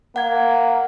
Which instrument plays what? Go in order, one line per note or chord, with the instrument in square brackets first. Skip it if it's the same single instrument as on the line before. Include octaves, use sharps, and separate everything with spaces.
[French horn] A#3 [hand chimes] F#5 G#6